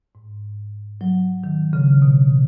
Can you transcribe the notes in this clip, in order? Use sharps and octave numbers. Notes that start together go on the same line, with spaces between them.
G#2
F#3
D#3
C#3
B2